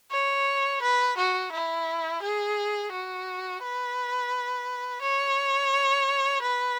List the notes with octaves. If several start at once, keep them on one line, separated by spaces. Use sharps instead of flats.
C#5
B4
F#4
E4
G#4
F#4
B4
C#5
B4